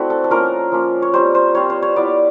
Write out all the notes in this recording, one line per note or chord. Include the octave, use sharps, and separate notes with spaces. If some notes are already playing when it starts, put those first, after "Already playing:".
Already playing: A3 C4 E4 F#4 D5
A4
A4
F3 A#3 C#4 F4 A#4
F3 A#3 C#4 F4
C#5
G3 C4 F4 C5
C5
G3 C4 F4 C#5
C5
C#5
G3 B3 E4 D5